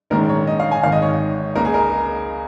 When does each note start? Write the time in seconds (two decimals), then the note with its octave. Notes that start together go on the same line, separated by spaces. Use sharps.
0.10 A#1 G#2 D#3 G#3 C#4 A#4
0.29 C#5
0.47 D#5
0.60 F5
0.71 G#5
0.83 G#1 G#2 D#3 F5
0.92 D#5
1.02 C#5
1.56 C#2 C#3 A#3 A#4
1.65 G#4
1.74 A#4